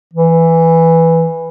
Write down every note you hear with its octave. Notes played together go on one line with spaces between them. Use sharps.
E3